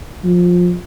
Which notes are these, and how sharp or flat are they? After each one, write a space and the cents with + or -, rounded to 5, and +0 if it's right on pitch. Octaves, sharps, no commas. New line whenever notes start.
F3 +20